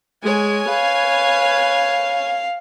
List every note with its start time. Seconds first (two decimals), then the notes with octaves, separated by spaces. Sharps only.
0.23 G#3 C#5 G#5
0.69 B4 F5